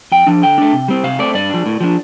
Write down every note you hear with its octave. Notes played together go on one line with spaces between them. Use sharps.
F2 G5
F3 D4
D3 G5
A3 D4
C3
G3 C4
C3 F5
A3 C4 D5
G2 D5
F3 D4
A2
F3 D4